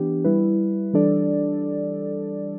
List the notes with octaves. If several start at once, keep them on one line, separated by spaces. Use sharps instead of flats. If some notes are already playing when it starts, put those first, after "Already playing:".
Already playing: E3 B3 D4 G4
G3 E4 B4
E3 G3 D4 A4 D5